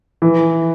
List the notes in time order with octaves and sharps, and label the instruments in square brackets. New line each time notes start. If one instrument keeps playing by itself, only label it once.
[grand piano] E3